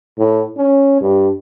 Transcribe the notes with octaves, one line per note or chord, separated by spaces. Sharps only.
A2
C#4
G2